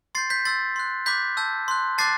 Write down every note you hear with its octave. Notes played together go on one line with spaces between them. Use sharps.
C6 G6 A6 C7
G6 B6
C6 E6 G6 A6
C6 F#6
B5 D6 F#6 G6 B6
A5 E6 G6
C6 F#6
A5 D6 F#6 A6 C7